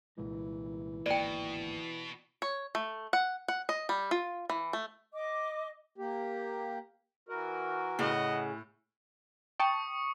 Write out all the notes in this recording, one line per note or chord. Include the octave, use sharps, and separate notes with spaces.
C2 A#2 E3 G#3
D1 G#1 B2 A#3 D5 G5
C#5
A3
F#5
F#5
D#5
G3
F4
E3
A3
D#5 D6
A#3 G4
E3 F#4 A#4
A2 C#3 D#5 F#5
G5 A5 C#6 D#6 C#7